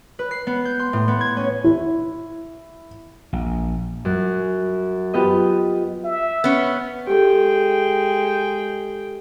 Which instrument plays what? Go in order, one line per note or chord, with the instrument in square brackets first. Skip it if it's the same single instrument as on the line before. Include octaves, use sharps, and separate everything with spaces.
[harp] B4
C7
B3
G6
C6
A2
B3
G#6
C#4
[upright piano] E4
[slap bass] A#1
[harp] F#2
B3 F4 G4 D#5
[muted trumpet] E5
[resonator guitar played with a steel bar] B3 C#4
[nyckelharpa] G#3 G5 [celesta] G4 A4